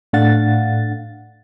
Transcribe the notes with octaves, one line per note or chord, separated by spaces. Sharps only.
A2 A3 D4 F5 F#5 A6